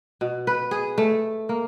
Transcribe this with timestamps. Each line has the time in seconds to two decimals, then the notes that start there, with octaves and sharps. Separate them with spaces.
0.21 B2
0.47 B4
0.71 G#4
0.98 A3
1.49 A#3